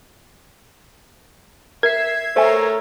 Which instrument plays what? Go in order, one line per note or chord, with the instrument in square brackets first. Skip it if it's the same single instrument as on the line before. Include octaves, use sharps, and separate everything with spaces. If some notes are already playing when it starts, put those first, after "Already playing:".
[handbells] A#4 [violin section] E5 [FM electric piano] G#6 C7
[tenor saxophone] A3 [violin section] A#4 C#5 [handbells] C5 E5 G#5